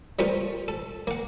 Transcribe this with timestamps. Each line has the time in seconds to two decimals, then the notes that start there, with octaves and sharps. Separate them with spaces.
0.19 G3 A3 B3 F4 A#4 C5
0.68 A4
1.07 A#3 F#5